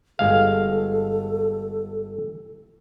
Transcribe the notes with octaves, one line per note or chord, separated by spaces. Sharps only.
G1 G#3 A4 F5